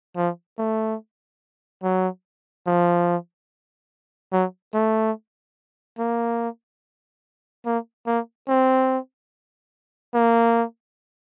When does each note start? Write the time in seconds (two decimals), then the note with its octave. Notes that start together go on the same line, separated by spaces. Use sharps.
0.17 F3
0.58 A3
1.83 F#3
2.67 F3
4.32 F#3
4.74 A3
5.99 A#3
7.66 A#3
8.07 A#3
8.48 C4
10.14 A#3